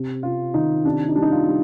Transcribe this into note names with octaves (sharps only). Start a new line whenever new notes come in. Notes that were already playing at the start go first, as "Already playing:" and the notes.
Already playing: C3
C3 F4
D#3 D#4
C3 D4
D#4
G3 D4
D#4
F4
G3